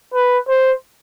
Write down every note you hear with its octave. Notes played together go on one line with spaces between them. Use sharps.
B4
C5